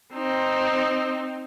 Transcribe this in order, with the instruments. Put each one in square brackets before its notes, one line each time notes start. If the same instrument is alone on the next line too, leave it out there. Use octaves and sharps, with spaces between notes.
[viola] C4 D#4